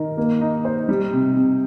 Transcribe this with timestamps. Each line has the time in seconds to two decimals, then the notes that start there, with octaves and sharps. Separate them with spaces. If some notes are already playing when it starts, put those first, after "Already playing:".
Already playing: D#3 A#4
0.17 A#3
0.41 D#4
0.65 C5
0.89 G3
1.13 C3
1.36 C3